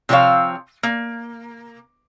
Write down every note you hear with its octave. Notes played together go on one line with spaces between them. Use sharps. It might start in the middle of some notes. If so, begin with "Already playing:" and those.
C3 F3 C4 F4 C#5 F5
A#3